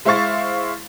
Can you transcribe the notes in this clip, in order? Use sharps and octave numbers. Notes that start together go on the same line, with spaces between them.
G#3 E4 C5 F5 C#6 A6